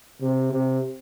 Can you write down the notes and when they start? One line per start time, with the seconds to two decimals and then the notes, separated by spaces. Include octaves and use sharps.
0.22 C3
0.52 C3